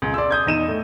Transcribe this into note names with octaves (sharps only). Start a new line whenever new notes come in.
C#2
D5 C6 E6
D#6 G6 G#6
E2 D#4 D#7 E7
A2